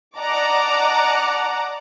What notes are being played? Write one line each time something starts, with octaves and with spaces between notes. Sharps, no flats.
D5 D#5 F#5 A5 A#5 D6